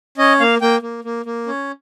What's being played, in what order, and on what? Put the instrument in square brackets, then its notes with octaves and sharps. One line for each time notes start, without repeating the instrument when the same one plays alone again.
[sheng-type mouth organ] C#4 D#5
A#3 F5
A#3 G5
A#3
A#3
A#3
C#4